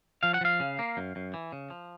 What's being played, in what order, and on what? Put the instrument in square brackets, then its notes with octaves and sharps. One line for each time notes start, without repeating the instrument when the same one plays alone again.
[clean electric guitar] F3 F5
F#5
F3 F5
C#3
A#3
F#2
F#2
E3
C#3
F3